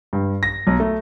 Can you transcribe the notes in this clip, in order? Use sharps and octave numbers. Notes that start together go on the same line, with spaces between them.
G2
A#6
B1
A3